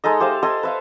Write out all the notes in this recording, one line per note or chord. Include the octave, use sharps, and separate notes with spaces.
G#3 D#4 A4 D#5
G4 C5 E5 F5
A4 D#5 G#5 C6
B4 E5 F5